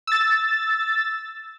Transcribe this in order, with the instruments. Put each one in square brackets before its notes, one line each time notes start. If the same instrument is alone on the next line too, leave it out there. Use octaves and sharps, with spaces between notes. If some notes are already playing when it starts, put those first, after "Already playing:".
[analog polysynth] E6 A6